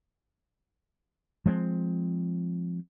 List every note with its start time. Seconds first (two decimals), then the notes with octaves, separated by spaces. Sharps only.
1.46 F3 G#3 A#3 C4